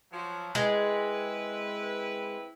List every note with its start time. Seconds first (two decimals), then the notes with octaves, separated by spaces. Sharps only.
0.12 F3 F#3
0.55 G#3 C4 E4 B4